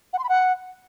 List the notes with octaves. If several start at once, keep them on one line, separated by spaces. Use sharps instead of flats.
F#5
C6
B5
F#5